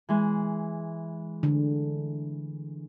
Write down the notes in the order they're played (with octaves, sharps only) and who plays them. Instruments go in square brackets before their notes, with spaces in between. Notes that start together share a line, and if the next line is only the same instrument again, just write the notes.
[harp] E3 G#3
[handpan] D3